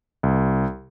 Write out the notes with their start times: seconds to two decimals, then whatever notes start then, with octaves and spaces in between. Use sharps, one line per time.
0.23 C2